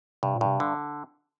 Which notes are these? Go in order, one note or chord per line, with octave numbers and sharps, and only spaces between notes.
G2 C3
A#2
G2 C3
D3